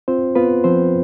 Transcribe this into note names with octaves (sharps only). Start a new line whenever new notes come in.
C4 F4 C5
B3 F4 B4
F3 C4 C5